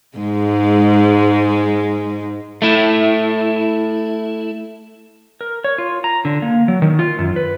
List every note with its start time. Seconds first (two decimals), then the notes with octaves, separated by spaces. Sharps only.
0.17 G#2 G#3
2.62 A3 E4
5.41 A#4
5.64 C#5
5.78 F4
6.04 A#5
6.25 D3
6.42 A#3
6.68 F#3
6.82 D#3
6.99 F4
7.19 F#2
7.36 B4